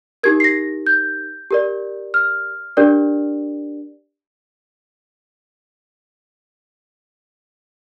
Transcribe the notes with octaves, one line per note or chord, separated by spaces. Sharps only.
D#4 G4 A#4 G#6
C7
A#6
G6
G4 A#4 D5
F6
D4 G4 A#4 D5